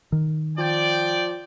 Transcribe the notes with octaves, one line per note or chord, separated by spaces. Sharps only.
D#3
F3 D5 G5